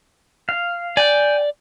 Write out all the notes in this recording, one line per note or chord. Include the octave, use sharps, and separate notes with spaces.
F5
D5 G5 G#5